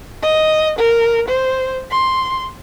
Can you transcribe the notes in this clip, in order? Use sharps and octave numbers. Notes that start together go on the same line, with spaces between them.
D#5
A#4
C5
C6